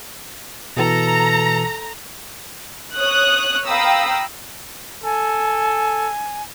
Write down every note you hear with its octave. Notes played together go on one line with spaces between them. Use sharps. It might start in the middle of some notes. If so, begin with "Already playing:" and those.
B2 E3 A4 A#5
C#5 D#6 F#6
F5 G5 A#5 B5 D#6 E6
A4 G#5